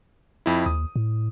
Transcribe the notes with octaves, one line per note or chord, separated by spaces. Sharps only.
F2 E4
D#2 D#6
A2